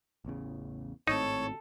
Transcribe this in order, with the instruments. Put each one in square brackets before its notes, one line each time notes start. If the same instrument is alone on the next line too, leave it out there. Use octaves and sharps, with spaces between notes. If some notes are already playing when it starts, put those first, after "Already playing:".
[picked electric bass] A1 E2 C#3
[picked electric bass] G#1 A2 C4 [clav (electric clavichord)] D#4 [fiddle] A4 [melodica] C#5